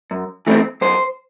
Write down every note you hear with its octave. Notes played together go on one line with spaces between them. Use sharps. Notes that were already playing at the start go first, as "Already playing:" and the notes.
F#2
E3 A3 C4
F#2 C5